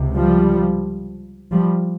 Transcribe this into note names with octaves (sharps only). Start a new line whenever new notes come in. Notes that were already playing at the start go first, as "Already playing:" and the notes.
Already playing: C#2 C3
F3 G3
F3 G3